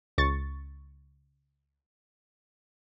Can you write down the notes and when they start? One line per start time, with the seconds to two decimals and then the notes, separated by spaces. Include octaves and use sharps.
0.18 C#2 C#6 A6